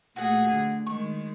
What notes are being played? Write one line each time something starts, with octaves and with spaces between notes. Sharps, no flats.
A#2 A3 F#4 G#4 F#5
D3
D#3 G#3 C#6